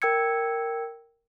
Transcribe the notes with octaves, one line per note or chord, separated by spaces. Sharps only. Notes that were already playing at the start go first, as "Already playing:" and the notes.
A#4 G5 E6 G#6 C#7